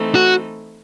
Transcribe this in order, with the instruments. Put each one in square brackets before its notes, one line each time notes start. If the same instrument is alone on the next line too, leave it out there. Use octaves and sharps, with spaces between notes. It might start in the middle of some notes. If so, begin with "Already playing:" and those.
Already playing: [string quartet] E3 A3 C4 D#4
[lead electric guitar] F#4